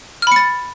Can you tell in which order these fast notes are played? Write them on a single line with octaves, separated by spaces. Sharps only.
F6 B5 C#7 A6